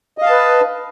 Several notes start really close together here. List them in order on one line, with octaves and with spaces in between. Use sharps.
D#5 F5 A5 B4